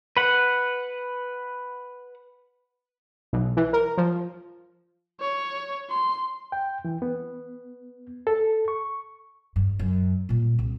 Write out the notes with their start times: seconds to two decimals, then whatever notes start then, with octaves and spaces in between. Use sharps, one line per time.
0.17 B4 F#5
3.33 B1
3.57 E3
3.73 A#4
3.97 F3
5.21 C#5
5.90 C6
6.52 G5
6.85 E3
7.02 B3
8.27 A4
8.68 C#6
9.56 G2
9.79 F#2
10.29 A#2 G3
10.59 C2